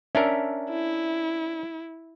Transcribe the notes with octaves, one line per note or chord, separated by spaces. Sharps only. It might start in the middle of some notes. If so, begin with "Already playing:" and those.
C#4 D4 A#4 E5
E4